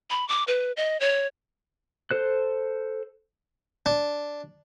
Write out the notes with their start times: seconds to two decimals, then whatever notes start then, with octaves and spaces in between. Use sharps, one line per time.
0.10 B5
0.28 D6
0.48 B4
0.77 D#5
1.00 C#5
2.11 A4 C5 F#6
3.86 D4